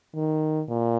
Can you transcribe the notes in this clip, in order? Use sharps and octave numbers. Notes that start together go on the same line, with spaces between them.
D#3
A#2